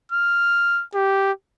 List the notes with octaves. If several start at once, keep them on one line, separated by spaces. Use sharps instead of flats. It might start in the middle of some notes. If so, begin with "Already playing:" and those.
F6
G4